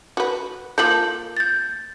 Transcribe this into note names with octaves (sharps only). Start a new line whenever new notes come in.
F#4 B4
A#3 F4 A4 G6 F#7
G6 A6